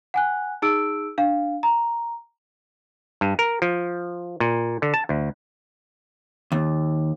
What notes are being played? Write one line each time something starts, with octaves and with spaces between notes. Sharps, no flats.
F#5 G#5 F#6
D#4 G#4 E6 D7
D4 F5
A#5
G2
A#4
F3
A#2
D3
A5
D2
D#2